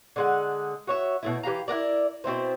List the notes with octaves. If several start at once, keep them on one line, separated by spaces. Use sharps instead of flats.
D3 G#3 F#5
F#4 C#5 E5
B2 A3 E4
E3 G4 F5 A#5
E4 F#4 A#4 D5
B2 C4 E4 C5